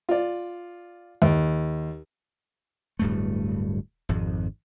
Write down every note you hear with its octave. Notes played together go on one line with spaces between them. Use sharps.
F4 D5
D#2
D1 G2 A3
G#1 F2